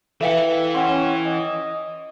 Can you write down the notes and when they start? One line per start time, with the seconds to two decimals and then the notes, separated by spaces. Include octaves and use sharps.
0.21 E3 A4 B4 E5 F5 G5
0.75 C#4 F#5 G5 C6
1.26 D#5